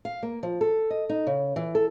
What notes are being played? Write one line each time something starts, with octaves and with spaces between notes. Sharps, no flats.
F5
A#3
F3
A4
D#5
D#4
C#3
E3
A4